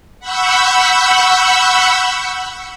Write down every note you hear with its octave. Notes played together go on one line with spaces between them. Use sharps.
F#5 B5 C#6 E6 G6